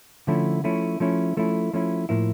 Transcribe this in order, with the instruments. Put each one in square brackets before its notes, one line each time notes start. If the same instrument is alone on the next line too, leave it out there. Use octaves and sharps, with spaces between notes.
[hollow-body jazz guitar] D3 F3 A3 C#4 E4
F3 A3 C#4 E4
F3 A3 C#4 E4
F3 A3 C#4 E4
F3 A3 C#4 E4
A2 F3 A#3 E4